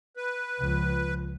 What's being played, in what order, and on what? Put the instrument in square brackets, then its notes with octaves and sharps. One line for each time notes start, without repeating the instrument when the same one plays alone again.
[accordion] B4
[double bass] C#2 F3